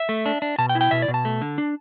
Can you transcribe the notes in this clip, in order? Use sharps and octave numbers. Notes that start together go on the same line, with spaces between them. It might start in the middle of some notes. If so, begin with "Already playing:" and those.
Already playing: E5
A3
D4
D4
B2 A5
G5
E4
G5
B2 E5
D5
B2
A5
A3
D3
D4